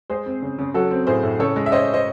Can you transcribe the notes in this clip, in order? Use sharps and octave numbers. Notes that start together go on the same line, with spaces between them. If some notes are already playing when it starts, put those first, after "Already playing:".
G#3 G#4 C5
C4
C#3
C#3
F#3 F#4 A4
C4
A2 G#4 C5
A2
C#3 A4 C#5
G#3
E5
C#4 C5 D#5
C5 D#5